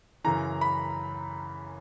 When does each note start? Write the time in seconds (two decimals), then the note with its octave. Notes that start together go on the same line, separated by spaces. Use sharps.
0.24 F#2 C#3 E3 A#5
0.61 B5